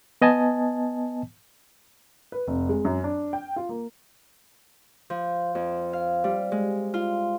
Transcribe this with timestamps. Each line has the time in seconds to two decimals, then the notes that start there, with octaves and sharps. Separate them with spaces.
0.22 B3 D#5 G#5 A5
2.32 B4
2.47 F1
2.69 G#3
2.85 F#2
3.04 D4
3.33 G5
3.56 F4
3.69 A#3
5.10 F3
5.55 F2
5.93 F5
6.24 G3
6.52 G#3
6.94 F4